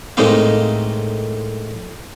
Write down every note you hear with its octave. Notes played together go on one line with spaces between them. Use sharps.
A2 G#3 A#3 C4 D#4 F5